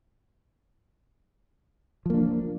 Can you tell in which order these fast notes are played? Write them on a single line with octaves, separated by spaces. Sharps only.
F3 A#3 D4